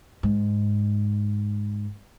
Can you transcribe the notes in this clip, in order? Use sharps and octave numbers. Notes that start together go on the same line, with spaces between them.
G#2